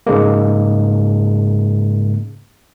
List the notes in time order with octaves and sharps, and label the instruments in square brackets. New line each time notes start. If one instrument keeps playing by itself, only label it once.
[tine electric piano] G#2 C#3 G#3 A#3